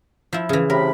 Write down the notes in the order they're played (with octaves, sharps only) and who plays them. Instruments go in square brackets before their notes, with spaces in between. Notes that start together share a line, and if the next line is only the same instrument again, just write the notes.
[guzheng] F3 E4
C#3 E3
[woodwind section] A2 C3 B5 [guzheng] A#4